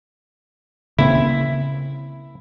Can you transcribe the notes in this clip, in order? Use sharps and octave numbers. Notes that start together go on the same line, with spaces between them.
C#3 A#3 C4 E4